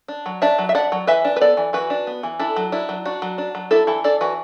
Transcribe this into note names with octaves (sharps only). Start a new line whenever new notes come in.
D4
F#3
D4 E5 A5
F#3
E5
D4 D5 F#5
F#3
E3 B4 E5
D4
B4
B3 A4 D5
E3
E3 F#4 B4
D4
B3
E3
D4 E4 A4
F#3
D4 E4
F#3
D4 F#4
F#3
D4
F#3
D4 E4 A4
E3 E4 A4
D4 A4 D5
E3 F#4 B4